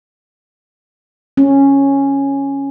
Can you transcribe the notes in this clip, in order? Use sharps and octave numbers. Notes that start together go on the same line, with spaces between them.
C#4